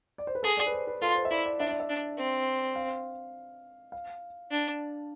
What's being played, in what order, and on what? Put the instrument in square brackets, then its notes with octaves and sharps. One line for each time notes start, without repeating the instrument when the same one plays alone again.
[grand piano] D5
C5
B4
[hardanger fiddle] G#4 [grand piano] A4
[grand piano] D5
B4
C5
B4
[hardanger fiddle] F4 [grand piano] A4
[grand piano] C5
E5
[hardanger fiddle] E4 [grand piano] D5
[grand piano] D5
[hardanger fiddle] D4 [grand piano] E5
[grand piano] D5
E5
[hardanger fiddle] D4
C4
[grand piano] F5
F5
[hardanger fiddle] D4